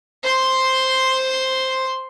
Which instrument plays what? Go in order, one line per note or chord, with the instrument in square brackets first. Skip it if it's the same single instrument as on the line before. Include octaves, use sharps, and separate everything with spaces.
[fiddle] C5 C6